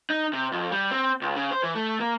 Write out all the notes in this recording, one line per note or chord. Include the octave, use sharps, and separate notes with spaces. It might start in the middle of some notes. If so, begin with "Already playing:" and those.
D#4
C3
F2
G3
C4
C#2
C#3
C5
E3
A3
A#3